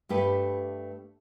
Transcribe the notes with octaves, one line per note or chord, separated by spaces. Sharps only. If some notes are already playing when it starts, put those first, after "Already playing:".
G2 A3 G4 B4